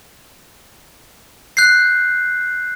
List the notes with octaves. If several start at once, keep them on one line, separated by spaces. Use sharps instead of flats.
F#6 G6 C7